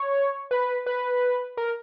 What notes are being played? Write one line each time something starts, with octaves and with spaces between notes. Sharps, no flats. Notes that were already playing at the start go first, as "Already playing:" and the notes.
Already playing: C#5
B4
B4
A#4